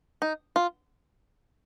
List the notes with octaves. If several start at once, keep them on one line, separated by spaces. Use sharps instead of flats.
D#4
F4